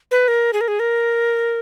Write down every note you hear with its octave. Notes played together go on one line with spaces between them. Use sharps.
B4
A#4
G#4
A#4
G#4
A#4